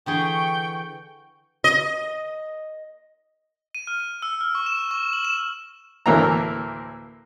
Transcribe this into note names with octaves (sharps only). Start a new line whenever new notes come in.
D3 E3 G#4 G5 C#6
D#5
D#7
F6
D#7
E6
F6
C#6
E7
C#6
F#7
E7
D2 A2 E3 A#3 A#5